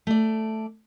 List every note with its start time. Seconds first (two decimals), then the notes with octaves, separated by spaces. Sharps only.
0.07 A3 D5